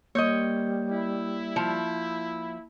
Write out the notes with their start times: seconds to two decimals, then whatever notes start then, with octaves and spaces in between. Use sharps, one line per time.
0.15 G3 A#3 C#5 D#5 G6
0.90 E4
1.56 F3